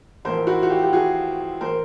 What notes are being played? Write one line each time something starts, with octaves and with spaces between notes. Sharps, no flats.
A1 A2 F3 A#4 C5
E4 F#4
F#4
F4 G4
G4
F#4 G#4
A2 E3 A#4 C5